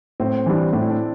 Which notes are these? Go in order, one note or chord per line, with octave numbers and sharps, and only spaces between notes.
A2 C4
E3 G3 D4
A2 D4
E4
D4